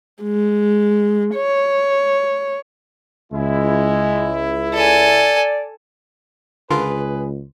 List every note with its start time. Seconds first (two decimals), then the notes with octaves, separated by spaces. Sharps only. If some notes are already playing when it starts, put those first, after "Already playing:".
0.23 G#3
1.35 C#5
3.33 C#2 G#3 E4
4.74 A4 D5 G#5
6.71 C#2 D3 F4 G#4 A#4 B4 C6